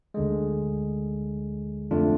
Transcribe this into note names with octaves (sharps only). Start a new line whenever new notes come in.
D2 D3 G#3
F2 D3 A3 D4 F4